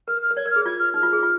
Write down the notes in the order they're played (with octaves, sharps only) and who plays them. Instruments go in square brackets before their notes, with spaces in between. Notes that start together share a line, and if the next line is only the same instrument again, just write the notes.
[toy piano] A#4 [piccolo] F6
[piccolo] F6
[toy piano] A#4
[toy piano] C#5 [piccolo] G#6
[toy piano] A#4
[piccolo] F6
[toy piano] G#4
[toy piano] F4 [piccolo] G#6
[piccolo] F6
[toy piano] D#4 [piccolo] F6
[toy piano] F4
G#4
F4